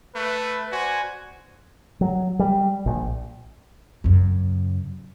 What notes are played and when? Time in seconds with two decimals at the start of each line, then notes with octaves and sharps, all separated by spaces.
0.15 A3 B4
0.72 F#4 C5 D5 G#5
2.01 F#3
2.39 G3
2.86 A#1
4.04 F#2 C#3